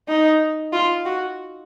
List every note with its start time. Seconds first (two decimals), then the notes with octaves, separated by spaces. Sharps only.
0.09 D#4
0.73 F4
1.05 F#4